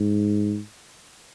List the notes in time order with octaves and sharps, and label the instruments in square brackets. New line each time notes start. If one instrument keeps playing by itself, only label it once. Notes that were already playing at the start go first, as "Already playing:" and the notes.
Already playing: [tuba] G#2